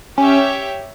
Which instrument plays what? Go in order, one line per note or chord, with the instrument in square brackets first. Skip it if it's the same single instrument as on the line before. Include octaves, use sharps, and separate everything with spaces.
[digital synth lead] C#4 [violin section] G4 C#5 E5 G5